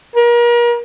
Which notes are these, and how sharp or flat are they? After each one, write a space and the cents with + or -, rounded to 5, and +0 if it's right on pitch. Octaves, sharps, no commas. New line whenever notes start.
A#4 +35